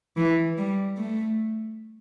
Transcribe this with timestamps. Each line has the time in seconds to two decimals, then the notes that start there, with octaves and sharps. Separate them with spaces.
0.17 E3
0.58 G3
0.97 A3